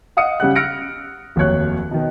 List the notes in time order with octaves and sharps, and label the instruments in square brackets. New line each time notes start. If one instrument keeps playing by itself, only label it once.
[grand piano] D#5 F5 F#5 D#6 C#7
C#3 G3 F#5 F#6
E6 F6 A#6 C#7 D7
F1 D#2 F#3 C#5 F#6
B2 D#3